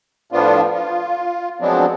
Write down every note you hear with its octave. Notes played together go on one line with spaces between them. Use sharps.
A2 F3 B3 D4 F4
F4
F3 F#3 G#3 B3 C4 D4